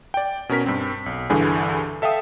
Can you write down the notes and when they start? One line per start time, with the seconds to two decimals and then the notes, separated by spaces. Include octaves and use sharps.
0.14 D5 G5
0.49 B2 C#4 A#4 B6
0.66 G2 C4
1.06 B1
1.30 C2 G2 D3 E3 G#4 G#5
2.02 A4 E5 F5 G5 D#6